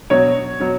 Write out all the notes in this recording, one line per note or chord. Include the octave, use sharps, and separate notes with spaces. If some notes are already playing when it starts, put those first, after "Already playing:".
B2 F#3 C#5
B2 F#3